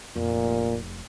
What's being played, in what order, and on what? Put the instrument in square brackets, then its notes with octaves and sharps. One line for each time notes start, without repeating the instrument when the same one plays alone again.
[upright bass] F1 [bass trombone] A#2